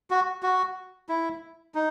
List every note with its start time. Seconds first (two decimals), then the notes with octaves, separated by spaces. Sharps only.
0.10 F#4
0.43 F#4
1.09 E4
1.75 D#4